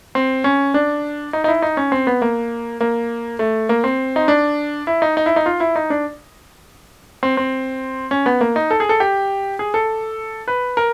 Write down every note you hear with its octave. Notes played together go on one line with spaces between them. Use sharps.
C4
C#4
D4
D#4
D#4
E4
D#4
C#4
C4
B3
A#3
A#3
A3
A#3
C4
D#4
D4
E4
D#4
D#4
E4
D#4
F4
E4
D#4
D4
C4
C4
C#4
B3
A#3
D#4
A4
G#4
A4
G4
G#4
A4
B4
A#4